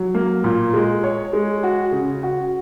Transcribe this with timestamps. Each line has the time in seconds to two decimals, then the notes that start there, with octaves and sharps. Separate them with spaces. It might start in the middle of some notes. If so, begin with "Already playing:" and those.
Already playing: F#3
0.14 A#3
0.44 A#2
0.74 G#3
1.04 C#5
1.33 G#3
1.63 F#4
1.92 C#3
2.23 F#4